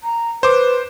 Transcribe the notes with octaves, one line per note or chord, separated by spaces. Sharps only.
A#5
B4 C5 D6